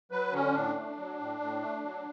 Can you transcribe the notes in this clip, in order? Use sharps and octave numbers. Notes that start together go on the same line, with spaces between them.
F#3 B4
D3 C#4
A2 D4
A3
F#3
A2
A2
A3
F#3